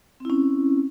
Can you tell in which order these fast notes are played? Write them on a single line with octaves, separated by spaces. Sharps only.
C4 E4 C#4